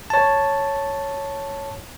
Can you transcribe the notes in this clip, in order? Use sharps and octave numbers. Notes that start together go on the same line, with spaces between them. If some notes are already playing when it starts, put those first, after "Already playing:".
C#5 A5